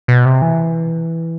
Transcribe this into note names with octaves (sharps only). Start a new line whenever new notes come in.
B2
C3
E3